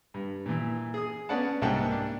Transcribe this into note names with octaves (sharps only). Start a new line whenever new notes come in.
G2
A#2 E3
G#4 D#6
B3 C#4 D5 F#5 A5
C2 G#2 A#3 F#5 G5 A5
D4